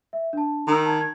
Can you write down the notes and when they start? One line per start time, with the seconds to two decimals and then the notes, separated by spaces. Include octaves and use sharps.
0.13 E5
0.33 D4 A5
0.67 D#3 A#5 E6
0.85 A5 G#6
1.01 G#6